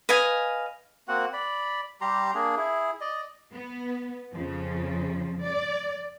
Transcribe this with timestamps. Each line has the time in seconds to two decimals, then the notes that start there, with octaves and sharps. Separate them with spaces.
0.09 B4 D#5 F5 G#5
1.08 A#3 C4 F#4 F#5
1.33 D5 B5
2.01 G3 G4 A#5 C6
2.35 A#3 D4 G#4
2.57 E4 G#4
3.01 D5 D#5
3.53 B3
4.33 F2 C#3 F3
5.45 D5